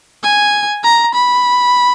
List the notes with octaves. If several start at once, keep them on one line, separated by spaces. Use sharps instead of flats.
G#5
A#5
B5